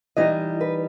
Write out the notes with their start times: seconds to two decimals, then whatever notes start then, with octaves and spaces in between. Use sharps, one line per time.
0.17 E3 G3 D#4 D#5
0.61 B4